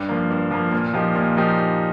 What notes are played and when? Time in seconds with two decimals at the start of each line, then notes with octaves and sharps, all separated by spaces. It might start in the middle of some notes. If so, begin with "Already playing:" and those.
Already playing: G2
0.09 F3 A#3
0.30 G2
0.51 F3 A#3
0.72 A#2
0.93 F3 A#3 D#4 G4
1.15 A#2
1.37 F3 A#3 D#4 G4